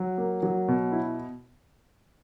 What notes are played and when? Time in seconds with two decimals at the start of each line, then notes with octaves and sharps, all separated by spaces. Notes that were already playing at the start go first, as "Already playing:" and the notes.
Already playing: F#3
0.18 A#3
0.43 F#3
0.68 B2
0.92 E4